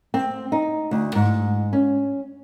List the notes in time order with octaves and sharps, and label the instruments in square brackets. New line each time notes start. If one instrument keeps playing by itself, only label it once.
[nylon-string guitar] C4
D#4
D2
G#2
C#4